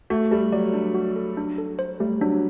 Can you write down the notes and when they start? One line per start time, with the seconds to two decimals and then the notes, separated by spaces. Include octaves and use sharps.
0.10 A3 F#4
0.31 G3 A4
0.52 F#3 D5
0.74 D4
0.94 F#4
1.16 A4
1.37 D4
1.58 A4
1.79 C5
2.00 G3 A3
2.21 F#3 D4